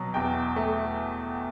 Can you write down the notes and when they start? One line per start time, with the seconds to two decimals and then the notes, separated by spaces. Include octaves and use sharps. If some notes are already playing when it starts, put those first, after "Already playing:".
Already playing: B2 F#3
0.14 E2 G5
0.56 A3